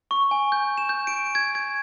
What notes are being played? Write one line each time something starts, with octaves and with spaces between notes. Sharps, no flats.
C#6
G#5
G6
E7
G6
D7
G#6
G#6